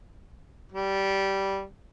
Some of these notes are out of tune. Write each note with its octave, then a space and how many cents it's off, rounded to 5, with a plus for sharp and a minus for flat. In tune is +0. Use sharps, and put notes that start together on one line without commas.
G3 -10